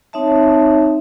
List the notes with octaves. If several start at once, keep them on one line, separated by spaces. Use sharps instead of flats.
C4 D#4 C#5 E5 A5